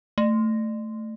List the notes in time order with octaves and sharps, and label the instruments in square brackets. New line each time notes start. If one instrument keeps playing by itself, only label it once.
[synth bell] A3